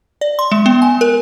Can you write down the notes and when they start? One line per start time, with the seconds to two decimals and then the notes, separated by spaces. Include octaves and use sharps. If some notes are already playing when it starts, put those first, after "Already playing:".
0.21 D5
0.39 C6
0.52 G#3
0.66 B3
0.82 G#5
1.01 A#4